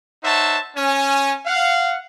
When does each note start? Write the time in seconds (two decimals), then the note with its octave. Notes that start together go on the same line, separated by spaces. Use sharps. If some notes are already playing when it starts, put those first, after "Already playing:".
0.24 D#4 C5 C#5 E5 F#5 A5
0.76 C#4 G#5
1.46 F5 F#5